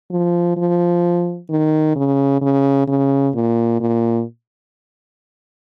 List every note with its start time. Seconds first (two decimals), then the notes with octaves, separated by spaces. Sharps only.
0.11 F3
0.57 F3
1.50 D#3
1.96 C#3
2.41 C#3
2.88 C#3
3.35 A#2
3.80 A#2